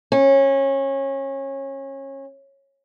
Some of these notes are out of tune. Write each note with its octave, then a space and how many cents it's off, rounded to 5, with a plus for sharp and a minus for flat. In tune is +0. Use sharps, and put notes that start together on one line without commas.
C#4 -25